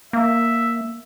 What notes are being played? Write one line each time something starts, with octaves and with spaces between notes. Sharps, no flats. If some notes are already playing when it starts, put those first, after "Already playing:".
A#3 E5